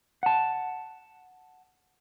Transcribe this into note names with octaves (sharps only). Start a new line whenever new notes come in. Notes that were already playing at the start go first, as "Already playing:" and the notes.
F#5 A5